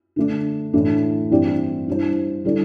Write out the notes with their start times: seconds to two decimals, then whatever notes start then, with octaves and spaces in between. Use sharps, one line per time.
0.16 D3 A3 D4
0.73 A2 E3 A3 D4
1.30 G2 E3 C4 G4 D5
1.87 G2 G3 E4 C5
2.44 D3 G3 E4 A4 D5